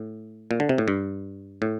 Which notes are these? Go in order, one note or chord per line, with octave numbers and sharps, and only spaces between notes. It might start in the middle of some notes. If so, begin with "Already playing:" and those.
Already playing: A2
A#2
D3
C3
A2
G2
A2